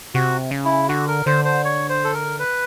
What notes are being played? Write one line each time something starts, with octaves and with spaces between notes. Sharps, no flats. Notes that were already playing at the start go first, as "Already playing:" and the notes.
C3 F#4
C#3
E4
D3 F#4
A#4
D3 C5
C5
C#5
C5
A4
A#4
B4